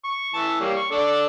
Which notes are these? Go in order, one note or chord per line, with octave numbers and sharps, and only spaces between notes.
C#6
E3 A5
G3 A#3 C#5
C#6
D4 A4 D5